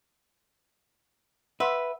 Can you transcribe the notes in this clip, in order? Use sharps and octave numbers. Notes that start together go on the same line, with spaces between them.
B4 E5 F#5 C6 E6